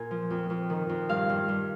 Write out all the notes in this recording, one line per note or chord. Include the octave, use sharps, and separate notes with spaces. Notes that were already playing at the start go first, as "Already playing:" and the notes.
Already playing: A#2 G#5
F3
F2
F2
D#3
F2
G2 F5
G2
G2